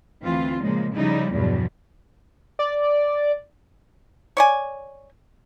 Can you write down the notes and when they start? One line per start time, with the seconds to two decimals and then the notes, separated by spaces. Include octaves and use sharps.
0.22 D2 E3 C4 F4
0.62 A#2 C#3 F3 G#3 A#3
0.94 C#3 F3 G3 D#4 E4
1.33 E2 G2 B2 F3 F#3
2.59 D5
4.37 C#5 D5 G#5